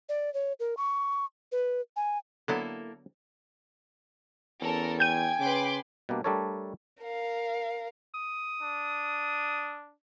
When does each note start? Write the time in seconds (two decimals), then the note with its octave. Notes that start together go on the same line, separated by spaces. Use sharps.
0.09 D5
0.34 C#5
0.60 A#4
0.77 C#6
1.52 B4
1.96 G#5
2.48 D3 F#3 A#3 B3 E4 A4
4.62 E2 C#4 A4 A#4
5.00 G5 G#5 G6 G#6 D#7
5.40 C#3 B4 C6 D6
6.09 B2 G3 A#3 D4
6.24 G3 A3 D4 A4 A#4 C#5
7.02 A#4 F5
8.14 D#6
8.62 D4